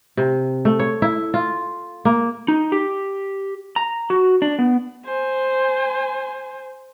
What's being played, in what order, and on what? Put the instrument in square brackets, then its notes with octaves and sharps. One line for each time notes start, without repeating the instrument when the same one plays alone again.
[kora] C3
A3
C#5
E4
F4
A#3
[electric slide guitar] D#4
G4
A#5
F#4
D4
B3
[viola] C5 G#5